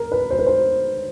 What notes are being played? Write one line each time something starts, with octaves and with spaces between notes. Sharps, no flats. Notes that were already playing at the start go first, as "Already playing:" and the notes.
Already playing: A#4
B4
C5
B4
C5